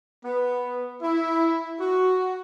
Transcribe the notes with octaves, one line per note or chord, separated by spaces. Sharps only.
B3
E4
F#4